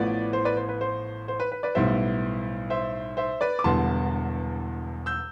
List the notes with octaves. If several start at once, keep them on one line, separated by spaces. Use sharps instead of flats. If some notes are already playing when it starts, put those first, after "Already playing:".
Already playing: A1 A2 F3 B3 B4 D5
C5
B4 D5
C5
B4
C5
C5
B4
B4
B4 D5
B1 A2 G3 B3 C5 E5
C5 E5
C5 E5
B4 D5
D6
E1 E2 D3 G3 B3 A5 C6
E6 G6